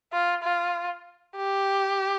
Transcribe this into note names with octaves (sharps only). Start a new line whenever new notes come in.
F4
F4
G4